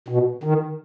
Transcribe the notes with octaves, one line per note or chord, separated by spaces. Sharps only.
B2
D#3